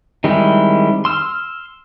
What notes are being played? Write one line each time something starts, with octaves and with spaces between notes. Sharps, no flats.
D#3 G3 G#3 C4 E4
C6 E6 F6